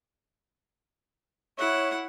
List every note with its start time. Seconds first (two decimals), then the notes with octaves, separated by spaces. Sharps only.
1.58 E4 C#5 F#5